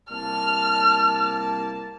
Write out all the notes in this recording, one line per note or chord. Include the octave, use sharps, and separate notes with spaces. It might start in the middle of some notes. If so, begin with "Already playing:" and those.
C2 A#3 A5 F6